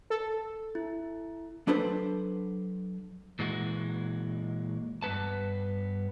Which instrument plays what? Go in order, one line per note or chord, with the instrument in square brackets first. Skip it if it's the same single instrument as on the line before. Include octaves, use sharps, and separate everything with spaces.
[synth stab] A4
[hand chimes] E4
[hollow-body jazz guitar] F#3 D4 A4 B4 C5
[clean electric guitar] A#2 E3 G#3 F#4
G2 B3 B4 A5